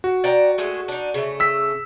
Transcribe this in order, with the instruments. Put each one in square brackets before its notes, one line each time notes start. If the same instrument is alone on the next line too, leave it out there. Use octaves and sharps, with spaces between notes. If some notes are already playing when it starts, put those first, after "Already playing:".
[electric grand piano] F#4
[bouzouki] D5 G5 A#5
G#3 A3 G#4
D4 D#4
C#3 A3
[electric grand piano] E6 B6